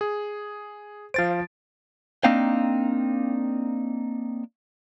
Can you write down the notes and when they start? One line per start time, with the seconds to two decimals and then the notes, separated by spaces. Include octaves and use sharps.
0.01 G#4
1.14 F3 C5 F5 A6 D7
2.24 A#3 C4 D4 D#4 F5 G5